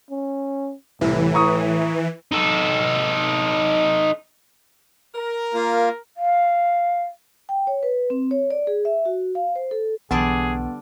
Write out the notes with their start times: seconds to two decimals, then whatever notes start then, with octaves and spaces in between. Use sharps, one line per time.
0.11 C#4
1.01 C2 A2 E3
1.34 A#5 C#6 D#6
2.32 D#4 A4
5.15 A#4
5.54 A#3 F4
6.17 F5
7.49 G5
7.67 C#5
7.83 B4
8.10 C4
8.31 C#5
8.50 D5
8.67 G#4
8.85 E5
9.05 F#4
9.35 F5
9.55 C5
9.71 A4
10.11 B1 D3 E3 G3 B3 D4 G#4